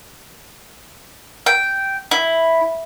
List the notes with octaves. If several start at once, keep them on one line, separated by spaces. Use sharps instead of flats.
G5
E4